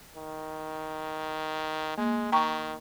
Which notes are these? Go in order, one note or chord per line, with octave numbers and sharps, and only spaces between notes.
D#3
G#3 A#3
D#3 G5 A#5 C#6